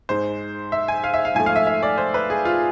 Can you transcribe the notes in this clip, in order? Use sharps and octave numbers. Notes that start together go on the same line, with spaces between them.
G#2 G#3 C5
E5
G#5
F5
E5
F5
G#2 F3 A3 G#5
F5
E5
E5
D5
C5
B4
G#4
F4